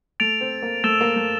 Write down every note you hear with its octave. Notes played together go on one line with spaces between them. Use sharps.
A3 A6 D7 F7
C4
A#3
A3 E6 A6 E7 G7
A#3
A3